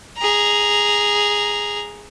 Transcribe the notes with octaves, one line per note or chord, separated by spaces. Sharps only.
G#4 A#5